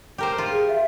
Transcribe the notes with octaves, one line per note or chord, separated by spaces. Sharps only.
G4 A#4 C5
F4
G#4
E5